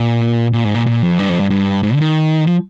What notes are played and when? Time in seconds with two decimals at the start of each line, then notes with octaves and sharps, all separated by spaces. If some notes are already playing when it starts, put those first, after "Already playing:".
Already playing: A#2
0.53 A#2
0.64 G#2
0.75 A#2
0.86 A#2
1.02 F2
1.19 G2
1.29 F2
1.40 G2
1.50 G2
1.83 G#2
1.94 D3
2.00 D#3
2.47 F3